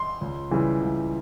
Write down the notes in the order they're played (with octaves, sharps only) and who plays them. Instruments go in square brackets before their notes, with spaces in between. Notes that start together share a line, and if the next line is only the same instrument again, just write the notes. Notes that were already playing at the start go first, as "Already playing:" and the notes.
Already playing: [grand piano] C6
C#2
C#3 E3 G3
C#2